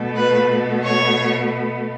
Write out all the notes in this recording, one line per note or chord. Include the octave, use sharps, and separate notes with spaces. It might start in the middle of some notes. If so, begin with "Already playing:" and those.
Already playing: B2 A3
B4
C#5